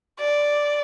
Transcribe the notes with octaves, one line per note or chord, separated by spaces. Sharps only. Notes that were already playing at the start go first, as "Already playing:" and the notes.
D5